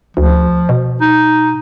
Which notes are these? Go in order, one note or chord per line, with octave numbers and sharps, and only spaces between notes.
D2 F3
B2
D#4